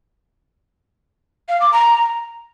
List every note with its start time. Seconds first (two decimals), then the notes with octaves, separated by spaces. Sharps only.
1.49 F5
1.60 D6
1.72 A#5